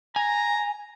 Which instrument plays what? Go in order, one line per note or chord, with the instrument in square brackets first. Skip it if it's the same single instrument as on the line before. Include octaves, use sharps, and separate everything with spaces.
[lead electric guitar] G#5 [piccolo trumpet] A#5